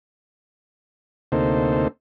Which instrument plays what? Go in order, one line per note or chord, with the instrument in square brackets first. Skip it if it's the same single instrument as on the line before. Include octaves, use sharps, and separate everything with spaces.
[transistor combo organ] D2 C3 A#3 D#4 A4 C5